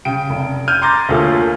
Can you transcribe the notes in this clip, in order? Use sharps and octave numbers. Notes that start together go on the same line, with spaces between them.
C#3 G5 D7
F1
F6 G6 G#6 D#7
A#5 C6 D6 G6 A6 A#6
D2 A#3 F4 G#4 A4 C#5